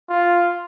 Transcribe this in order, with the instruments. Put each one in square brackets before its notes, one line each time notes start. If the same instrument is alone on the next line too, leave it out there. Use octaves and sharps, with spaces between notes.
[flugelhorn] F4